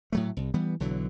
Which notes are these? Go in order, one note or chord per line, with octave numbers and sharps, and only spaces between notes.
A2 F#3 A3
C2
E3 G3 B3
B1 D3 E3 F#3